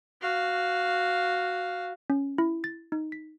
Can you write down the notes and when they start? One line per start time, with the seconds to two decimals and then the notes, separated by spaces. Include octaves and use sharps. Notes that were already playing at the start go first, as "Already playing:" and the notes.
0.22 F#4 F5
2.10 C#4
2.38 E4
2.64 A6
2.92 D#4
3.12 B6